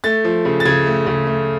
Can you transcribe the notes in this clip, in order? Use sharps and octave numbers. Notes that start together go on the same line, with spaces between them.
A3 A6
F3
C#3
A6
C#3 G#6
A3
C#3
A3